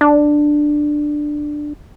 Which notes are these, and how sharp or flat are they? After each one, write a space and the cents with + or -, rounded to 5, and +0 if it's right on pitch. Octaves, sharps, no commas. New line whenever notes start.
D4 +10